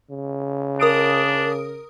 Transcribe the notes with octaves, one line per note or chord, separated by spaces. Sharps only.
C#3
D4 A#4 D#6 D7